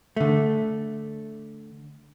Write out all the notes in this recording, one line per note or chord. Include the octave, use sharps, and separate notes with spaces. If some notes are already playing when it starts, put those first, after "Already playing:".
D3 A3